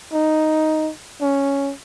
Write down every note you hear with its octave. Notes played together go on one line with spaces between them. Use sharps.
D#4
C#4